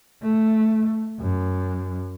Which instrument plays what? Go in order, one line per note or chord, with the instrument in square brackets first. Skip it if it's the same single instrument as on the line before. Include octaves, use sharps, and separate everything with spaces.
[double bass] A3
F#2